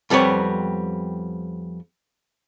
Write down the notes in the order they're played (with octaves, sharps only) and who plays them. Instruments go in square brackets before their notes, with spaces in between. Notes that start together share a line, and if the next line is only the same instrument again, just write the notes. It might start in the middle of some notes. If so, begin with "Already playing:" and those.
[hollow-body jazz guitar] F2 G3 B3 C4 C#5